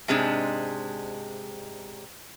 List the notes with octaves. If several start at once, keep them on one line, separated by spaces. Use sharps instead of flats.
G#2 C3 G#3 D4